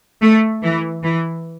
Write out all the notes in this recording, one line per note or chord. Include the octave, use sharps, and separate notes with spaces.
A3
E3
E3